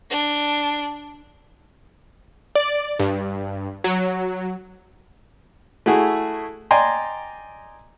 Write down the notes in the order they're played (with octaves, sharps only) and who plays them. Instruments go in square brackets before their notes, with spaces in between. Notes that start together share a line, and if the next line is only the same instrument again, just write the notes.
[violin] D4
[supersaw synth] D5
G2
F#3
[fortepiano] A3 E4 F#4 G#4
D5 D#5 G5 G#5 A#5 C6